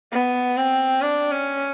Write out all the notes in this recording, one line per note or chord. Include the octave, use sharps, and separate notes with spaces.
B3
C4
D4
C#4